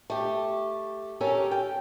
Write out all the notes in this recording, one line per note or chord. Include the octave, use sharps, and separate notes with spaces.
A3 G4
C#4 G4 A4 A#4
G5